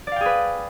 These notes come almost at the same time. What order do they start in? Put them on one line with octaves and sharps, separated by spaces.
D5 F5 G5 G#4 B4